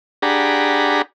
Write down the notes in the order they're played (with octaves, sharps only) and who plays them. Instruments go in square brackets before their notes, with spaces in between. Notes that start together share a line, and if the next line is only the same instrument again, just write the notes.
[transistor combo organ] D4 G4 G#4 F#5 A#5 B5